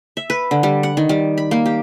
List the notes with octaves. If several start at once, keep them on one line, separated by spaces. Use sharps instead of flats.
E5
B4
D3
G3
F#5
D#3
G3
B5
A#3
G4